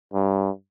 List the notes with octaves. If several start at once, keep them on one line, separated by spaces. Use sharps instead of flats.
G2